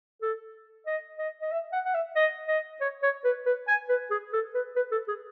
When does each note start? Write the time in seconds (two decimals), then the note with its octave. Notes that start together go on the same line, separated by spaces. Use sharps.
0.22 A4
0.87 D#5
1.19 D#5
1.42 D#5
1.52 E5
1.73 F#5
1.86 F#5
1.95 E5
2.16 D#5
2.48 D#5
2.81 C#5
3.03 C#5
3.25 B4
3.46 B4
3.68 G#5
3.89 B4
4.11 G#4
4.33 A4
4.55 B4
4.76 B4
4.92 A4
5.08 G#4